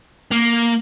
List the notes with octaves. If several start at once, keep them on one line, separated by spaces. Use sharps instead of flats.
A#3